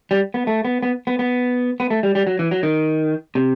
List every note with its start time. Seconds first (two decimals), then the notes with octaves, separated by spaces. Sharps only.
0.11 G3
0.34 B3
0.47 A3
0.65 B3
0.83 B3
1.07 B3
1.19 B3
1.80 B3
1.90 A3
2.03 G3
2.15 G3
2.27 F#3
2.39 E3
2.51 F#3
2.63 D#3
3.35 C3